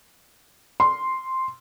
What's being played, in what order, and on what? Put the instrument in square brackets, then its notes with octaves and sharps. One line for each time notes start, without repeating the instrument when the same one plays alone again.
[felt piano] C6